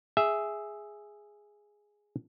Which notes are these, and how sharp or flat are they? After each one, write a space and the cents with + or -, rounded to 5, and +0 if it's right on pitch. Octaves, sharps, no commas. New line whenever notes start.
G#4 +0 E5 +0